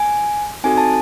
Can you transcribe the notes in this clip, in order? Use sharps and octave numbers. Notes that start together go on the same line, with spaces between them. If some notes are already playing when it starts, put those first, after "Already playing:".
Already playing: G#5
C4 D#4 F#4 A4 G#5
A5